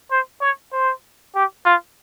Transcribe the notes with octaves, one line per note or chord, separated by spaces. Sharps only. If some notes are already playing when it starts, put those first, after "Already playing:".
C5
C#5
C5
G4
F4